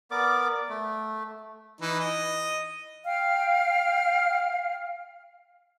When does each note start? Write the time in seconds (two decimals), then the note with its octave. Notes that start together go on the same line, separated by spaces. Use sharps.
0.11 B3 A#4 D5 D6
0.69 A3
1.81 E3 D#4
2.00 D#5
3.05 F5 G5 F6